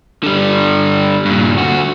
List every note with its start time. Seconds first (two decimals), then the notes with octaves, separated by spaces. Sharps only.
0.23 D3 G3
1.25 G2 A#2
1.58 D3 F#4